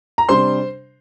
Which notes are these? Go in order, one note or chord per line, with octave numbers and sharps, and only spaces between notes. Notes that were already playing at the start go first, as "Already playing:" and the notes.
A#5
C3 G3 D4 C5 C6